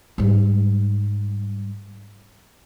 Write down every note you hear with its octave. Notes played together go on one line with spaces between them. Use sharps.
G#2 G3